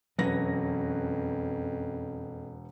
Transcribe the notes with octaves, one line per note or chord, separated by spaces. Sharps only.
E1 F2 F#3 C4 C#4 B4 A#6